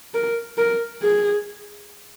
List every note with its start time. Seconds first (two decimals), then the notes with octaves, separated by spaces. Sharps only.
0.14 A#4
0.58 A#4
1.02 G#4